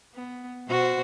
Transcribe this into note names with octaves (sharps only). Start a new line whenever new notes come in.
B3
B2 F#4 C5